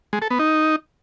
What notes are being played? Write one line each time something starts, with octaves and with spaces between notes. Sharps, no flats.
G#3
A4
B3
D#4